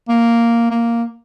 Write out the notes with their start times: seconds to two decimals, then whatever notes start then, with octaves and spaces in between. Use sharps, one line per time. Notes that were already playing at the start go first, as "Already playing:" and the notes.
0.09 A#3
0.71 A#3